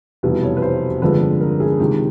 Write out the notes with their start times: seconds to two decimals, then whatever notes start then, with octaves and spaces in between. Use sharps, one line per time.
0.23 F1 E2 B2 G3 B4
0.43 C#5
0.57 B4
0.62 C5
1.02 G1 F2 D3 F3 G#3 B4
1.41 A#4
1.60 G#4
1.80 C#2 C3 D#3 G#3 G4